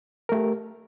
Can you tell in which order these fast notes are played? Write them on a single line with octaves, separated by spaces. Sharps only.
A#4 A3 G4